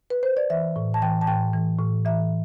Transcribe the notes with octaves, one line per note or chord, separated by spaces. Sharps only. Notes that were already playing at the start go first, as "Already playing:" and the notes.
B4
C5
D5
E3 E5
A2
A5
E3 G5
A5
A2 G5
E3
A2
E3 E5